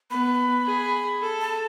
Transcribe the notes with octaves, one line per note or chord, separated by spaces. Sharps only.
B3 B5
G#4
A4
A5